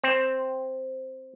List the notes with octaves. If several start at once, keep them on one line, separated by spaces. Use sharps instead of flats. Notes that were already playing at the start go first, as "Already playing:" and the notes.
C4